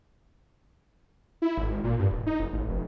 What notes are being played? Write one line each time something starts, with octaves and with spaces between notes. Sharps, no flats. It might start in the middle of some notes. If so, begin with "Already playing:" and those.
E4
G#1
G#1
A#2
G2
E1
D#4
F1
A1
F1